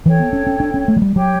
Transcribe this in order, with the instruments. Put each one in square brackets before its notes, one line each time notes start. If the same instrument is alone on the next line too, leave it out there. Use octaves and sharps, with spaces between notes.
[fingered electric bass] E3 [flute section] A4 C#5 G5
[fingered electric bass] B3
C#4
C#4
D4
C#4
A3
F#3
G3
[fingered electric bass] F#3 [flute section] G4 C#5 G5